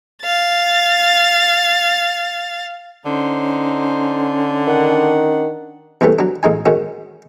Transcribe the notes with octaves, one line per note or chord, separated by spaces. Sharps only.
F5 A6
D3 C#4 D#4 C5
D#3 D4 F#5
E2 C3 E3 G3 A3
F#3 D4
A1 G#3 D#4 G#5
G#2 D#3 C#4 F#4